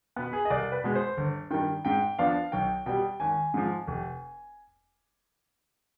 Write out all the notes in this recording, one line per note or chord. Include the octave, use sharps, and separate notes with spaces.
B2 B3 B4
G#4
D#5
C2 D5
B4
B2 G#3
C5
G1
G2 D#3 G5
G#2 G5
F3 B3 D4 F5
B1 G5
B2 G3 G5
G#1 G#5
G#2 F3
F1